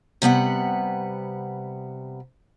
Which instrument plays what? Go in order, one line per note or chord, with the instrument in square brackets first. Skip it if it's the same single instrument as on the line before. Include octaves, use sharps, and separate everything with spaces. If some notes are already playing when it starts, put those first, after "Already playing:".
[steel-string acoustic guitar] C3 G3 B3 F#5